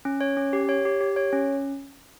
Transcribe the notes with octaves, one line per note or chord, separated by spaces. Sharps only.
C#4
C#5
C#4
G4
C#5
G4
G4
C#5
C#4